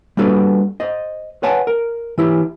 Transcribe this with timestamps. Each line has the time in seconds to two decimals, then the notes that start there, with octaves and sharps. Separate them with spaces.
0.17 G3 A#3 D4 F#4 A4 B4
0.80 C5 D#5
1.43 B4 C#5 F#5 G#5 A5
1.67 A#4
2.18 E3 E4 G4